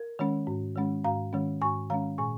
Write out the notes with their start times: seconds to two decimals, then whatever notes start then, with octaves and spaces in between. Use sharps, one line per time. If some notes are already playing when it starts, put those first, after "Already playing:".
Already playing: A#4
0.19 D#3 G#3 C#4
0.47 G#2
0.76 D#3 G#3 C#4
1.04 G#2 F5 A#5
1.33 D#3 G#3 C#4
1.61 G#2 G#5 C#6
1.90 D#3 G#3 C#4 F5 A#5
2.18 A#2 G#5 C#6